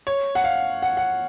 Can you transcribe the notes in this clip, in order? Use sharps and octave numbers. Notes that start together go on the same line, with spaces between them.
C#5
F#5
F5
F#5
F#5